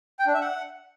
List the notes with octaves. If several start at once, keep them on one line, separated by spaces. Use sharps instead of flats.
G5
D4
E5
F#5